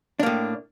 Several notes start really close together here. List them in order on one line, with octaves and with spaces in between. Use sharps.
D4 A#3 A2